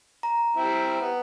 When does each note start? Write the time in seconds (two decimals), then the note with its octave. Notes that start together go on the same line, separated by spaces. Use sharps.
0.23 A#5
0.57 G3 C4 E4
1.00 B3